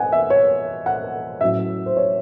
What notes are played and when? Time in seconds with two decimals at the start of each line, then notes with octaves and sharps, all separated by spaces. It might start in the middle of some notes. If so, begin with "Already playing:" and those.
Already playing: D#5 F#5 G#5
0.12 E5
0.30 C#5
0.86 F#5
1.41 A2 F#3 C#4 E5
1.86 C5
1.97 C#5